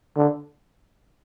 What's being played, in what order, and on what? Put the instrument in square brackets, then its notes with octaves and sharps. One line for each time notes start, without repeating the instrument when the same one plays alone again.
[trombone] D3